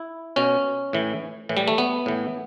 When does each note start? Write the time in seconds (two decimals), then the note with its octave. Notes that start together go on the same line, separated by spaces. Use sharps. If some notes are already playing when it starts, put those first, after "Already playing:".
Already playing: E4
0.36 B2 C#4
0.93 A2 E3
1.49 A2 E3
1.57 G3
1.68 A3
1.78 B3
2.06 A2 E3